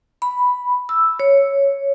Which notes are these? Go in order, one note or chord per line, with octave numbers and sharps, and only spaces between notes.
B5
E6
C#5